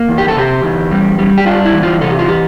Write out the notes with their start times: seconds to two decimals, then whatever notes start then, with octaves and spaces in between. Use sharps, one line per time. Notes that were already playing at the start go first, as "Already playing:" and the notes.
Already playing: A#3
0.09 E2
0.18 G4
0.28 A4
0.36 C3 G4
0.63 E2
0.91 G3
1.19 G3
1.38 G4
1.46 D4 F4
1.65 E4
1.74 E3
1.83 F4
2.01 C3 A4
2.10 G4
2.19 F4
2.28 E3 G4